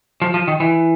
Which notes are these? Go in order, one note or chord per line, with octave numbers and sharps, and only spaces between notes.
F3
F3
D#3
E3